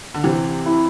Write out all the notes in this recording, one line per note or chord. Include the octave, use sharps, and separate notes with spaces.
D3
C3 E3 C4
E4